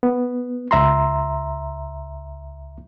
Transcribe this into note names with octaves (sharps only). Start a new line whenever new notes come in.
B3
C#2 E5 A#5 C6